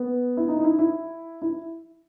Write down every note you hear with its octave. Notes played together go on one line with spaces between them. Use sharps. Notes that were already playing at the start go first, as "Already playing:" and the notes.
Already playing: B3
E4
D#4
D#4
E4
E4
E4